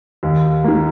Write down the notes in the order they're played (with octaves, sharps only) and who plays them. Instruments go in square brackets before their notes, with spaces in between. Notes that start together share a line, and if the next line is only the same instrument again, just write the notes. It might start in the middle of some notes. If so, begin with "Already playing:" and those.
[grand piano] D#2
D#3 A#3